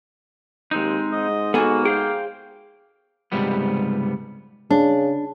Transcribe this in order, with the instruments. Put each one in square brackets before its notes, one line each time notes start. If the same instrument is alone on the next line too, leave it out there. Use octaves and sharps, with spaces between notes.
[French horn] D#2 [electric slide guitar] G#3 C4 D#4
[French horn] G#2 [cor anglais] D#5
[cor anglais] A#3 [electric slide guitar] B3 F#4 [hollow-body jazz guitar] A4 G#5
[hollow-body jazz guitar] G#4 [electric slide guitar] C5 F5 G5
[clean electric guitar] C#2 G#2 C3 G3 B3
[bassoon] C#3 [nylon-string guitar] D4